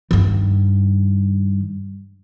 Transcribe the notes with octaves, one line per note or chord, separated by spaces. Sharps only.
G2 D#3